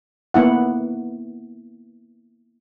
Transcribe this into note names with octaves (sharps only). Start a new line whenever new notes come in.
A#3 B3 E4 F#5